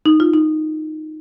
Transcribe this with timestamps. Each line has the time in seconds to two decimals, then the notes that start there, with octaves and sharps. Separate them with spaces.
0.06 D#4
0.20 F4
0.34 D#4